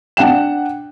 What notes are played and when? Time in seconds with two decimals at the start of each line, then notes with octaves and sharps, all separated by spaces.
0.17 D4 F#5 G5 E7